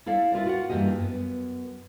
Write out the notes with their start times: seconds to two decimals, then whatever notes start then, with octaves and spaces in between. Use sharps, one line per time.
0.06 E4 A4 D5 F5
0.32 E4 F4 A#4 D5
0.45 F4 F#4 A#4 E5 F#5
0.69 G2 E3 A#3 G4 D#5
1.00 F#2 B3